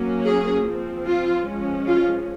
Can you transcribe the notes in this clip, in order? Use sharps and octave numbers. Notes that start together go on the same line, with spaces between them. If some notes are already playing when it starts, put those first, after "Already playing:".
Already playing: F#3 A#3 C#4
G#4
F3 C4
F4
F3 G#3 C#4
F4